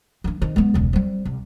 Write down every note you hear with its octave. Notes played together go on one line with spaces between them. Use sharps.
E3 D4
D#3 C4
G#3 B3
E1 C#2
G3 C4
C2